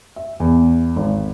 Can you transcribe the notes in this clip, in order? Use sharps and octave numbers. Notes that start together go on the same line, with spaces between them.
E5
E2
G#1